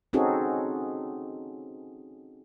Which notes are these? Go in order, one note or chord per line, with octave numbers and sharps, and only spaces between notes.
C4 C#4 D#4 F#4 G#4 A4